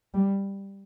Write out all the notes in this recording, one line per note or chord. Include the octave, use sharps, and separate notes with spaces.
G3